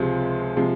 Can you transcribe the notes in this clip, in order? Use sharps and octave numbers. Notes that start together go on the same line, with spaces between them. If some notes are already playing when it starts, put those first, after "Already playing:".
Already playing: C#2 C3 F3 G#3 C5
C3 F3 G#3